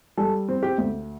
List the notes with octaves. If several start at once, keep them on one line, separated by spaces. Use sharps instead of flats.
G3 A4
C4
G4
D2